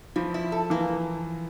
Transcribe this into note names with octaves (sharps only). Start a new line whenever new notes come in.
E3 F3
E4
A4
E3 A#3